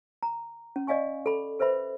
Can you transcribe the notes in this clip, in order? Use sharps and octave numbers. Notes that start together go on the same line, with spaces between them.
A#5
C#4
D5 D#5 F5 G#5 C#6
A4 B5
A4 B4 C5 E5 B5